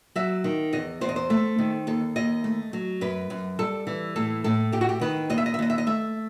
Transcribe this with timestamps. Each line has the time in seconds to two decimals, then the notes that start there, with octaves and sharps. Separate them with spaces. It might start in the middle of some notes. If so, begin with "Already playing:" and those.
0.16 F#3 E5
0.44 D#3
0.73 E2 D#5
1.01 E2 C5
1.09 D#5
1.16 C5
1.30 A3
1.59 D#3
1.87 D#2 A4
2.16 D#2 D#5
2.44 A3
2.73 F#3
3.01 F#2 B4
3.30 F#2
3.59 G3 A4
3.87 E3
4.16 A2 A4
4.44 A2 A4
4.72 A3 G4
4.81 F#4
4.89 G4
5.01 D#3 B4
5.30 D#2 D#5
5.38 E5
5.46 D#5
5.54 E5
5.59 D#2 D#5
5.70 E5
5.78 D#5
5.87 A3 E5